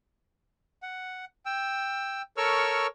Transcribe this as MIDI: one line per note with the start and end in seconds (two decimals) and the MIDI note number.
0.83 1.25 78
1.46 2.22 79
1.46 2.22 88
2.37 2.87 69
2.37 2.87 70
2.37 2.87 73
2.37 2.87 85
2.37 2.87 88
2.37 2.87 89